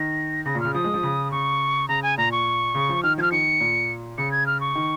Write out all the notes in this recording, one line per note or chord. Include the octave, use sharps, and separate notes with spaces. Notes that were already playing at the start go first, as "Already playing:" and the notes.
Already playing: D#3 A#6
C#3 A#6
A#2
C#3 F6
F3 D#6
G#3
F3
C#3
C#3 C#6
C#3 A#5
G#5
A#2 A#5
C#6
C#3
F3
D#3 F6
F3 F6 G#6
D#3 C#7
A#2
C#3 C#7
G#6
F6
C#6
D#3